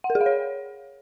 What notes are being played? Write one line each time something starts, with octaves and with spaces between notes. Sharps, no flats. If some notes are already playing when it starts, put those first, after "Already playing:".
F#5
A#4
G#4
F5
C#5